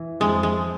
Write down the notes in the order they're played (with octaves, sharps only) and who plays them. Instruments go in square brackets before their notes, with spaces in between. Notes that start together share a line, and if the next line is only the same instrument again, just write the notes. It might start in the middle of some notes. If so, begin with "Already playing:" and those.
Already playing: [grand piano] E3
[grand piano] F2 [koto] G#3
[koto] G#3